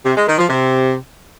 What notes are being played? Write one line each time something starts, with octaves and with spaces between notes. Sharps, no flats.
C3
G#3
D#3
F3
C3